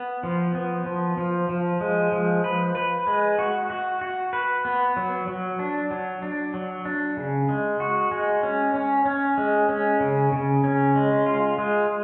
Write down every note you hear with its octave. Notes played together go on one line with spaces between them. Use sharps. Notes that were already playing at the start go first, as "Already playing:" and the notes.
Already playing: B3
F3
B3
F3
F3
F3
G#3
F3
B4
B4
G#3
F#4
F#4
F#4
B4
B3
F#3
F#3
D4
F#3
D4
F#3
D4
C#3
G#3
F#4
G#3
C#4
C#4
C#4
G#3
C#4
C#3
C#3
C#4
G#3
F4
G#3